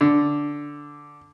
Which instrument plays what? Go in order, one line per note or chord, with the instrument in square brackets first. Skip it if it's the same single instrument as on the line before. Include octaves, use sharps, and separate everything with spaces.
[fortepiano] D3